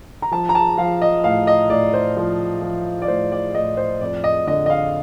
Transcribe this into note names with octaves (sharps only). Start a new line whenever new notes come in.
A#5
F3 A5
A#5
A5
F3 F5
D#5
A2 F5
D#5
A2 D5
C5
F3
F3
D5
A2 C5
D5
A2 D#5
C5
F2 D5
D#5
D3 D#5
D#5
F5